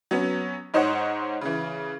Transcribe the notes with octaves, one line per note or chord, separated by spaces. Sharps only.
F#3 B3 C#4
G#2 D#4 C5 C#5 D#5 F#5
C#3 E3